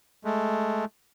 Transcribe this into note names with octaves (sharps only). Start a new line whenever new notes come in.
G#3 A3